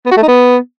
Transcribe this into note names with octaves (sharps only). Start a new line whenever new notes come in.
B3
F#4
A3
D#4
B3